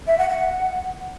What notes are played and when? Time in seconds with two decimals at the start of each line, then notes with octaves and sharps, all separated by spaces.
0.07 E5
0.18 F#5
0.29 F#5